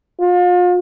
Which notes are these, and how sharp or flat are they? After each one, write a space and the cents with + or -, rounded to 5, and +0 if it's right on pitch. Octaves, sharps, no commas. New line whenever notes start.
F4 +35